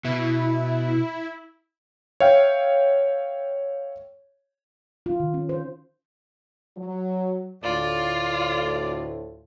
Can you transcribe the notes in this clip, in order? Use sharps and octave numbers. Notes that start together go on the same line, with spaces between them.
B2 E4
C#5 E5 F5 G5
F4
D#3
C#4
C5
F#3
D2 A2 F4 D5